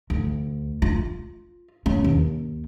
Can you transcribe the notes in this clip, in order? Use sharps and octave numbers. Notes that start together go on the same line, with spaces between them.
D2
F4
C#4
D#2